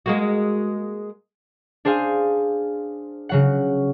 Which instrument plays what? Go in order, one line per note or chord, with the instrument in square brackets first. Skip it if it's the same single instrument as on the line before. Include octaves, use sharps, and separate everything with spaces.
[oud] G#3 A#3 F#4
[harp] D4 G#4 C5 F5 G#5
C#3 F#3 F#5